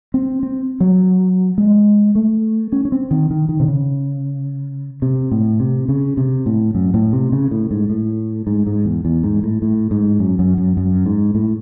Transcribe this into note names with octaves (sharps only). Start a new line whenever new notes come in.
C4
C4
F#3
G#3
A3
C#4
C#4
C4
D#3
D#3
D#3
C3
C#3
C3
A2
C3
C#3
C3
A2
F#2
A2
C3
C#3
A2
G#2
A2
G#2
G#2
E2
E2
G#2
A2
A2
G#2
F#2
F#2
F#2
F#2
G#2
A2